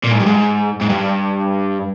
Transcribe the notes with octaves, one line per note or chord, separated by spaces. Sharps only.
A#2
G#2
G2
G#2
G#2
G2